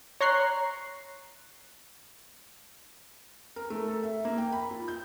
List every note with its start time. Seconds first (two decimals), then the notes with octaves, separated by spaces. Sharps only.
0.21 C#5 A#5 C6 C#6 F#6 C7
3.56 A#4
3.70 A3
3.88 A4
4.03 E5
4.25 A#3
4.38 G5
4.52 B5
4.71 F4
4.88 G6